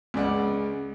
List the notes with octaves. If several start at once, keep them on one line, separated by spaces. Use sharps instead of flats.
C#2 C#3 D5 F#5